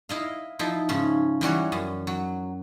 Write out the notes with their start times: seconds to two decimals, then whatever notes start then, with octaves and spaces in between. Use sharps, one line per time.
0.09 E4 D#5 F5
0.59 F3 D#4 E4
0.89 G#2 C#3 C#4
1.41 E3 G3 F#4 C#5
1.72 F#2
2.07 F#3